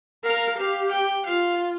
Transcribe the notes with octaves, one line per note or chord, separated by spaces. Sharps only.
A#4 F5
G4 F5
G5
F4 F5